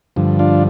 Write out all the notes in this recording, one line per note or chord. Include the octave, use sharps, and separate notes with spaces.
G2 D3 F3
D4 F4